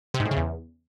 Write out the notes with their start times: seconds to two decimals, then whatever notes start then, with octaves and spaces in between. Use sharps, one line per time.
0.14 C3
0.20 G#2
0.25 A2
0.31 C#3
0.37 E2